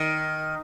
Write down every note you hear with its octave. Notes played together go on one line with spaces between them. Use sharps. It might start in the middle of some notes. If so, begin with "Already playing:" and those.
Already playing: D#3